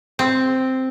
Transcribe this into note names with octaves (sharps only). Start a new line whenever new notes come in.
C4